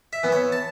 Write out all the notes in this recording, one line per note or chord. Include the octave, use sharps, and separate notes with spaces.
E5
E3 B3
C#5
A5